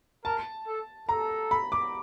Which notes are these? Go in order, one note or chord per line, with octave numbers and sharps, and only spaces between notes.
A#4 A5
A4
A4 A#5
B5
D6